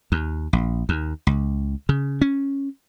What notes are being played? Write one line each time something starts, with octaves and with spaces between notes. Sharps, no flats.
D#2
A#1
D#2
C#2
C#3
C#4